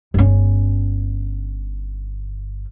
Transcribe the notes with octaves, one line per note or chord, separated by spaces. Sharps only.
G1 C#4